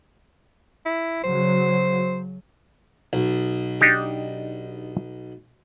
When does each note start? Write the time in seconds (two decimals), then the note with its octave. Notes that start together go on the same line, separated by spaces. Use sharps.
0.86 E4
1.23 C#3 F#3 C5
3.13 B1
3.81 D4 D#4 G4